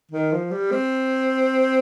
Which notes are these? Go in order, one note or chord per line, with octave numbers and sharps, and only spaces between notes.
D#3
F3
G3
C4